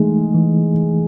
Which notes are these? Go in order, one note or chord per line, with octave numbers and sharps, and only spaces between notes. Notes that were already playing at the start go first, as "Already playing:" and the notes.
Already playing: E3 G#3 A3 D#4
E3